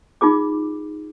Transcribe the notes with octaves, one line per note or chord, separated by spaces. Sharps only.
D#4 F4 G#4 D6